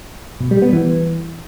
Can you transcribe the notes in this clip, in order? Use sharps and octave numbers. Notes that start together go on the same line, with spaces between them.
B2
G3
B3
E3